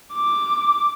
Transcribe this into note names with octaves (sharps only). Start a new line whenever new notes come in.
D6